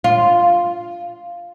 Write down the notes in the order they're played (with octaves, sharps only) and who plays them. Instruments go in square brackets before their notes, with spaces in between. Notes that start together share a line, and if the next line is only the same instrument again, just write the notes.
[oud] F4